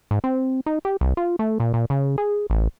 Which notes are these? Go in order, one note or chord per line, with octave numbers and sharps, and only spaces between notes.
G#2
C4
D#4
G4
C2
F4
A3
A#2
A#2
C#3
G#4
A1